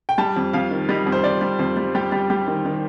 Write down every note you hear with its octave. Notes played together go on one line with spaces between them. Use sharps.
G5
G3 A5
F2
F2 F5
D#3
G3 D#5
F2
C5
F2 D5
G3
F2 C5
G3
G3 G4
G3
G3 G4
D#3
D#3